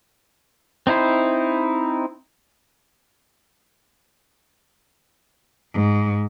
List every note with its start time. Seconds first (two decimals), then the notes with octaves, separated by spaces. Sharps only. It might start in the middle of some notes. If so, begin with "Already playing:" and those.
0.87 C4 D#4 E4 C5
5.72 G#2